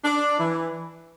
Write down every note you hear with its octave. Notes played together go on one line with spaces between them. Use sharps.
D4
E3